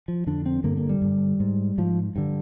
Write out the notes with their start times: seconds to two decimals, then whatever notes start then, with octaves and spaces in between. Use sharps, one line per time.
0.08 F3
0.26 F2 D3 D4
0.46 C4
0.64 G2 D3 A#3
0.77 A#3
0.89 G3
1.02 G2 D3
1.40 G#2
1.78 G#2 F3
2.16 G2 D3